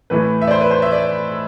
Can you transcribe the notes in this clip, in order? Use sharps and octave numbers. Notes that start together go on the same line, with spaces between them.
A2 E3 A3 B4
E5
D5
C5
B4
C5
E5
D5